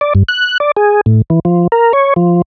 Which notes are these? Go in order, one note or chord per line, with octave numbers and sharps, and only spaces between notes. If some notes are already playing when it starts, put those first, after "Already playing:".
D5
G2
F#6
D5
G#4
A2
E3
F3
A#4
C#5
F3